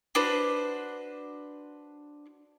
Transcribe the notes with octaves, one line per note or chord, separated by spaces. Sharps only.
D4 F#4 B4 C5